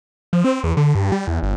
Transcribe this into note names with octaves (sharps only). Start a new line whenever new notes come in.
F3
C4
E2
D3
G2
G3
E2
G1